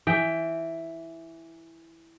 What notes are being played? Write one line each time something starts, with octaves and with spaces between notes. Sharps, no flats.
E3 G5